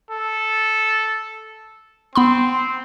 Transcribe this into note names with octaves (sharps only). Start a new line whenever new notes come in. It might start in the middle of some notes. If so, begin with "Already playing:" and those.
A4
B3 C4 B5 C6